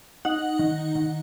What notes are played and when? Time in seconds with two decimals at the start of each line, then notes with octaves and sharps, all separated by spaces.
0.25 D#4 F#5
0.59 D#3
0.95 D#3